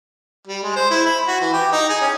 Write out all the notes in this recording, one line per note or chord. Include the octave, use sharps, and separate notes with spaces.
G3
G#3
C5
E4
B5
F#4
E3
G4
D#4
G#4
C#4